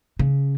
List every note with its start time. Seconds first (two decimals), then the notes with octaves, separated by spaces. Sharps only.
0.19 C#3